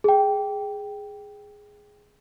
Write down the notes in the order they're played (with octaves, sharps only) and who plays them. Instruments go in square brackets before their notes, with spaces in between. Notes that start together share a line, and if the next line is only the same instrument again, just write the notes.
[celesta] G#4 G5